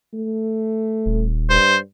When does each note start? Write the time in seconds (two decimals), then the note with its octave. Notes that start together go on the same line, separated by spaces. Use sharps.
0.14 A3
1.06 D#1
1.50 G2 C5